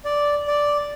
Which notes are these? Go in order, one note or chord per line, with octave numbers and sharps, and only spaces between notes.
D5
D5